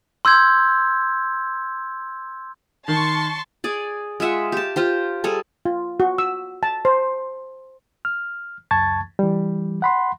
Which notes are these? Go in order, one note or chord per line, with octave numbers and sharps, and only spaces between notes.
C6 E6 G6 G#6
D#3 A5 C6 C#6
G#4 D5
G#3 F4 E5 F#5
G4 A5
F4 G4 C5
G3 G#4 A4
F4
F#4
E6
A5
C5
F6
C#2 F#2 A5 C#6 G#6 A6
E3 G3
F#5 B5 C6